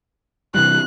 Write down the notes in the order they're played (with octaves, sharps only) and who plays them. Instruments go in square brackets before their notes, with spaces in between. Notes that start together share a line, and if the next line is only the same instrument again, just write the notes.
[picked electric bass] C3 E3 G3 [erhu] F#6